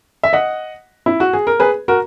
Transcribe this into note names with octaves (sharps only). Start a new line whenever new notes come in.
E5
D#5 F#5
E4
F#4
G#4
A#4
G#4 B4
F#4 A#4